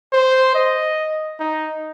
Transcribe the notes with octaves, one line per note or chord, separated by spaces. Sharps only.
C5
D#5
D#4